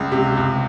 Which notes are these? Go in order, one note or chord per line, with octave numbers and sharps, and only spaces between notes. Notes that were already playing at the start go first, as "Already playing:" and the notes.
Already playing: C#2
C3
C#2